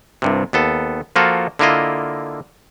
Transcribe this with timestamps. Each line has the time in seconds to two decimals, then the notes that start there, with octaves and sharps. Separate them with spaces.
0.22 C2 G2 C3
0.53 D#2 B3 A4
1.16 F3 A#3 F4 F#4 A4
1.59 D3 A#3 E4 F4 D#5